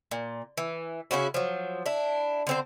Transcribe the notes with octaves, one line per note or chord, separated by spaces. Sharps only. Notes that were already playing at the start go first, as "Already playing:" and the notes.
A#2
E3
C#3 C#4 E4 F#4
F3 F#3
D4 E4
D3 C4 C5